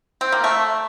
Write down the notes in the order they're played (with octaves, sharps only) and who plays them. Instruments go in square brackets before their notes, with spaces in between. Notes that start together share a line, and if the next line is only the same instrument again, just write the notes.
[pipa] C4
A#3
A3